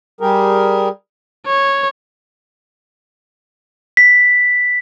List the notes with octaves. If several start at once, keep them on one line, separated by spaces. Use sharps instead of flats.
G3 G4 G#4 A#4
C#5
B6